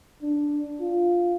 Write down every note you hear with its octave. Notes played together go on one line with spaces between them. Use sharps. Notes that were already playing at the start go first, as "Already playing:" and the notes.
D4
F4